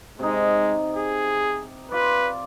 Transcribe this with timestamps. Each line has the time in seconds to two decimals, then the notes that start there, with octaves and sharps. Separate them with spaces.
0.19 C3 G#3 D#4
0.95 G#4
1.92 F4 B4 D5